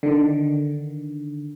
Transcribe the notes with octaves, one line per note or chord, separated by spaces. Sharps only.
D3 D#3